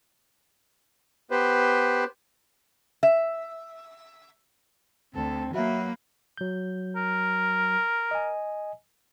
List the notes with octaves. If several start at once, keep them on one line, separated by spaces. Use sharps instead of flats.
B3 G4 B4 C5
E5
D2 C4 A4
F#3 A#3 F#4 B4 E5
F#3 G6
A#4
D#5 G#5